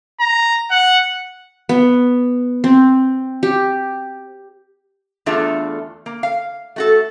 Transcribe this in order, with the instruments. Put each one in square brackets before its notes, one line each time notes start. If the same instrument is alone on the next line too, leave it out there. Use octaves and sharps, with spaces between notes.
[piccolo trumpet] A#5
F#5
[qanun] B3
C4
G4
[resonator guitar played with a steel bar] E2 A3 D4 F4 G#4 E5
A#3
F5
A3 F#4 A4